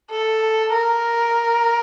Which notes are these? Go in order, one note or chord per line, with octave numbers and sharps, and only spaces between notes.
A4
A#4